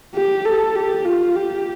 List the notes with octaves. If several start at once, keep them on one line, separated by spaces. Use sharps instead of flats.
G4
A4
G4
F4
G4